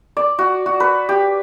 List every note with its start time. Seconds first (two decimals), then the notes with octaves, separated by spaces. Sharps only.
0.17 D5
0.39 F#4
0.66 F#4
0.80 B4
1.09 G4